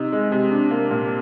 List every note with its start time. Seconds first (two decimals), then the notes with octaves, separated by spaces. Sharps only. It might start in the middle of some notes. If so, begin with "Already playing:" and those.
Already playing: C3 D#4
0.13 G#3
0.32 C3
0.51 D4
0.71 A#3
0.91 A#2